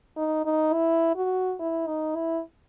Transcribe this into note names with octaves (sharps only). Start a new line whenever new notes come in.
D#4
D#4
E4
F#4
E4
D#4
E4